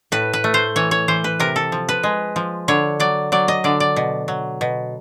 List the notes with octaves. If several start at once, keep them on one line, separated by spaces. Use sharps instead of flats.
A2 B4
B4
A3
C5
E3 C#5
C#5
E3 C5
B4
C3 A#4
A4
F3
B4
G#3
F3
D3 C#5
F#3 D5
F#3 D5
D#5
D3 D5
D5
B2
F#3
B2